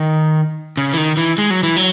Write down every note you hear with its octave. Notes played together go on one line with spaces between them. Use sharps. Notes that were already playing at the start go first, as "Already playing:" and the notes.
Already playing: D#3
C#3
E3
D#3
E3
G#3
F#3
E3
F#3